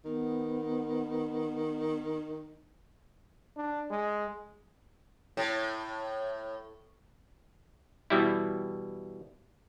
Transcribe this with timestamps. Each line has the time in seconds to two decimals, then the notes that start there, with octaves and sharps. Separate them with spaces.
0.05 D#3 B3
3.57 D4
3.91 G#3
5.37 A2
8.10 B2 E3 G3 E4